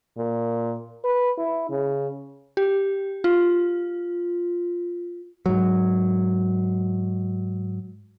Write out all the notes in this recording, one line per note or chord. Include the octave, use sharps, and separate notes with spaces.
A#2
B4
E4
C#3
G4
F4
G#2 F#3